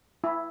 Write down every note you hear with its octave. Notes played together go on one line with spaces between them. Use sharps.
E4